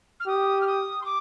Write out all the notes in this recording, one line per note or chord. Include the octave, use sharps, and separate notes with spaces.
F6
G4 D#6
F6
D#6
C6
D6